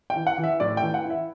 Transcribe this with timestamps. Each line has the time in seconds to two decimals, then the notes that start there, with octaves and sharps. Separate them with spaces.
0.10 G5
0.16 E3
0.27 F#5
0.38 E3
0.44 E5
0.60 A2 D5
0.77 G5
0.82 E3
0.94 F#5
1.05 E4
1.10 E5